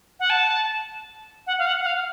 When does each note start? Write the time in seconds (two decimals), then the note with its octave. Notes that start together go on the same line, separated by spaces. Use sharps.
0.20 F#5
0.30 A5
1.47 F#5
1.59 F5
1.67 F#5
1.81 F#5
1.86 F5